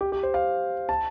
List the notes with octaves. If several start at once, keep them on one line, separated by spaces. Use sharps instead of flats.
G4
G4
C5
F5
A5